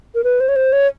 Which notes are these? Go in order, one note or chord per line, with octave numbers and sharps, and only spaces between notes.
A#4
B4
C5
C#5
C5
C#5